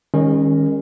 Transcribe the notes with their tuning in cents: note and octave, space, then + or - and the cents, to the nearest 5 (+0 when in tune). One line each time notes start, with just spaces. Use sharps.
D#3 +0 G#3 -40 C#4 -15